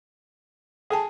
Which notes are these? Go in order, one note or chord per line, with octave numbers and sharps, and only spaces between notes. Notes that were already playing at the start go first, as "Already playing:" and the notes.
G#4 A4 G5 A5